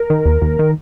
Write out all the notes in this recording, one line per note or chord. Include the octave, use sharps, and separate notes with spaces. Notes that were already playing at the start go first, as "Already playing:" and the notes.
Already playing: A#4
D#3
D#2
D#2
D#3